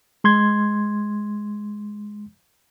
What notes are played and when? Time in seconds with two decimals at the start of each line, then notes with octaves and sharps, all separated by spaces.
0.24 G#3 C6 G#6